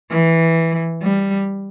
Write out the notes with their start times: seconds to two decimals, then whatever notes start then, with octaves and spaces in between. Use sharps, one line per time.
0.11 E3
1.02 G3